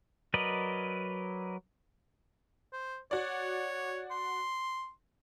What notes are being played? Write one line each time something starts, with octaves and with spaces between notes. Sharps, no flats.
F#3 A#4 B4 D5 D#5
C5
F#4 C#5 D5
C6